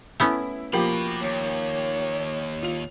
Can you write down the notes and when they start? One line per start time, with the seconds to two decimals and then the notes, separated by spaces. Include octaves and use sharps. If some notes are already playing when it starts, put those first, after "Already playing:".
0.20 A3 B3 C#4 E4
0.73 F3 A#3 F#4 G4 B5
1.21 D#2 C#5
2.63 F4 F7